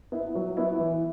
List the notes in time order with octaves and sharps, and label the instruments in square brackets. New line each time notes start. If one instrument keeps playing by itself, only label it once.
[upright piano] B3 E4
F#3
B3 E4
E3